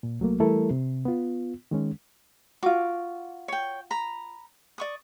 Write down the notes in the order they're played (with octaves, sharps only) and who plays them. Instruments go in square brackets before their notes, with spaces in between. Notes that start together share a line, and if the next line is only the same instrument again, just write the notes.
[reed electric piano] A#2
C2 F#3 A3 A#3
E3 G3 A3 E4 A4 A#4
C3
B3 F4
D#3 G#3 C#4
[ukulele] F4 F#4 [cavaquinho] D6
[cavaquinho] C#5 G5
A#5 B5
D5 C#6 D#6